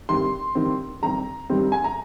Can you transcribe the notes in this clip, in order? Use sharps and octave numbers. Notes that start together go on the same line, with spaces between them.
G2 D#3 G3 C4 C6
G2 D#3 G3 C4
G2 D#3 G3 C4 A#5
G2 D#3 G3 C4
G#5
A#5